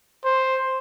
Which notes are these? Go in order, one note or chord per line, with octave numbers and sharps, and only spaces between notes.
C5